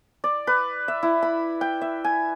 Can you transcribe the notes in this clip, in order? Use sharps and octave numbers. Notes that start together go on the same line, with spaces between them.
D5
B4
E5
E4
B5
G5
E5
G#5